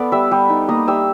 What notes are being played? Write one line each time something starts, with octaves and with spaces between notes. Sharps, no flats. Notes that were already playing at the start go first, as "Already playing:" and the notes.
Already playing: B3 A4 D5 D6
G3 E5 E6
G3
D#4
A#3 D#5 D#6
G3 E5 E6